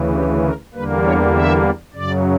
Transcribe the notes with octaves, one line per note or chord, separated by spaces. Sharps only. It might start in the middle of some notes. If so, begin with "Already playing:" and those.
Already playing: D2 C#3 E3
G4
A#4
E2 D3 G3 A#3 B4
C#5
E5
F#2 C#3 F#3 D5